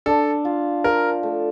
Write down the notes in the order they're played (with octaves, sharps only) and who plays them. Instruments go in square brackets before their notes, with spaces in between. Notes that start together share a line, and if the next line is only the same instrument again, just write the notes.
[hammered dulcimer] D4 [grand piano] A4
[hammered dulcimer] F4
[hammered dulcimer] F3 [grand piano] A#4
[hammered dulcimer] A3